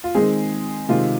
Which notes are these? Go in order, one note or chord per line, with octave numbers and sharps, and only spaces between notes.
F4
D#3 G#3 C4 G#4
C3 D#3 G#3 C4 F4